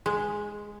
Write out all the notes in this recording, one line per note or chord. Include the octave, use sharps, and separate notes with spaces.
G#3